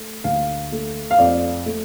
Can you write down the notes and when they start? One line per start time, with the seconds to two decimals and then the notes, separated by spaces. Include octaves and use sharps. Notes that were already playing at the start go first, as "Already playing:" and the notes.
Already playing: A3
0.24 D2 F5
0.72 A3
1.11 F5
1.18 F2 D5
1.66 A3